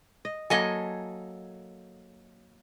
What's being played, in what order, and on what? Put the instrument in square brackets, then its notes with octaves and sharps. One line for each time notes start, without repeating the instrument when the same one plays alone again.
[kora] D#5
[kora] F#3 A4 [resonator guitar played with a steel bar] A#3 D#5 G#5